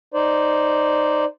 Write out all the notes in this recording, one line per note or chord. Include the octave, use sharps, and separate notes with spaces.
D#4 C5 D5